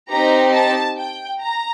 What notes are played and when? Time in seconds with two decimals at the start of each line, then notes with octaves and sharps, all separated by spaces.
0.11 C4 D#4 G4 A#5
0.54 A5
0.97 G5
1.41 A#5